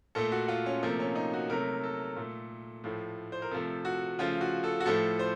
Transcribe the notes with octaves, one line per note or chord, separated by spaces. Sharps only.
A#2 A3 A4
F#4
F4
C#4
C3 F3 A3 A#3
C#4
D#4
F#4
C3 F#3 A3 A#4
A4
A#2 A3
A2 F3 A3
C5
A#4
C3 F3 A3 A4
F#4
C#3 F3 A3 F4
F#4
A4
F#4
A2 F3 A3 A4
C5